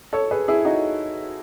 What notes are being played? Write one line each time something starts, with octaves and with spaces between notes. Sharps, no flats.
A4 C#5
G#4 B4
E4 G#4
D#4 F#4